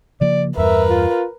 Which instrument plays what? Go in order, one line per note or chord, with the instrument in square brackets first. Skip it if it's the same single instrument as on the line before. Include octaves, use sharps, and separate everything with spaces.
[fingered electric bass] C#3 F3 A#3 [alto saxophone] D5
[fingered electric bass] E2 G2 [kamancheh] A#4 B4 [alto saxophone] E5
[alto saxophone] F4